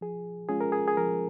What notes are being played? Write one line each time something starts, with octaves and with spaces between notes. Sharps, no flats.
F3 G#4
G#3 C#4 F4 G#4
A#4
G#4
G#4
F3 A#4